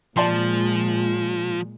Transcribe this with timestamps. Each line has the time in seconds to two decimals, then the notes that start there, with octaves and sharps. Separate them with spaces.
0.17 A#2 F3 G#3 D5 A5 C6